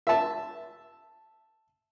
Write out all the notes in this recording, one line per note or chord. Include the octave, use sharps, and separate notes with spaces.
E5 A5